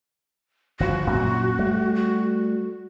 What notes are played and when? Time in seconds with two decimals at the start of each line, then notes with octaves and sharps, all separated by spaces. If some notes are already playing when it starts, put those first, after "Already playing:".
0.80 G1 F3 F#4
1.11 F#2 A#2 C#4
1.59 G3 A3
1.95 F#4